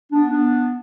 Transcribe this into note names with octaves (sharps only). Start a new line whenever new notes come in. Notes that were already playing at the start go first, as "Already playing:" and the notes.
B3 D4
B3 D4